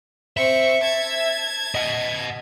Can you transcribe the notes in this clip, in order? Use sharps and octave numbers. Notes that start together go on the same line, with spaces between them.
C4 E5 C#6
A5 G#6
D#5 F#5